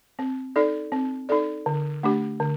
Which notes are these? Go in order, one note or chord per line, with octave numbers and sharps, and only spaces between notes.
C4
D#4 A4 D5
C4
D#4 A4 D5
D3
A3 D4 G4
D3